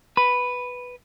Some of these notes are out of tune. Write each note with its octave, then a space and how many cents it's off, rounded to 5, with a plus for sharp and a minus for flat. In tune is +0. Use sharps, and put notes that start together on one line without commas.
B4 +0 B5 +0